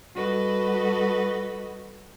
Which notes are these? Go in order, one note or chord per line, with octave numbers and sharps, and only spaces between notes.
G3 F#4 A4 B4 D#5